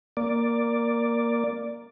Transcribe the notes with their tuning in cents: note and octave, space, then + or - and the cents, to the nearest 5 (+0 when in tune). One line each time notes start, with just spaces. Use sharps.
A#3 +5 D5 +0